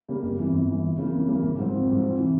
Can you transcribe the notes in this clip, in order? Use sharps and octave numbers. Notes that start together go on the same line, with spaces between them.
C#3 G3 A#3
G1
F2 E3
G1
F2 E3
F2
C#3 E3 A#3
F2
C#3 E3 A#3
G#1
G#2 F3 C4
G#1
G#2 F3 C4
F2
C3 E3